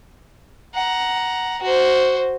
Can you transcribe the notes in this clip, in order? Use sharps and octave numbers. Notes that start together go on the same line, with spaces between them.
F#5 A#5
F#4 C5